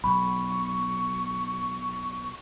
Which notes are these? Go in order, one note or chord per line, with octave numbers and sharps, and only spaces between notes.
B1 B5 C#6